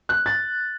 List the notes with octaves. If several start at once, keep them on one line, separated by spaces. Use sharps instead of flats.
F#6
A6